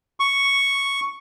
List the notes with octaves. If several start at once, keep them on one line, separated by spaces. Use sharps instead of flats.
C#6